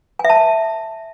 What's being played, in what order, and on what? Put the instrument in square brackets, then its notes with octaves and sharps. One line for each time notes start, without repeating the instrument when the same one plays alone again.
[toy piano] G#5
E5
A5